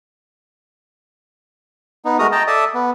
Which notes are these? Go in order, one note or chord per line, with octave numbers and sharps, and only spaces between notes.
B3 D#4
G#3 A3 F#4 A#4 A#5 D#6
D#5 G5 A5 A#5
A4 D5 E5 A5 D#6
B3